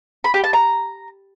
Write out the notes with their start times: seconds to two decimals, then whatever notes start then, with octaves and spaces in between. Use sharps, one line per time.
0.24 B5
0.34 G4
0.44 A5
0.53 A#5